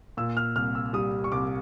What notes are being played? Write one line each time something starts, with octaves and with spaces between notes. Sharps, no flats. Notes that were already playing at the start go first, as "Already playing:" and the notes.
A#2 E6
F6
C2 F6
E6
G3 D#6
C#6
C2 D6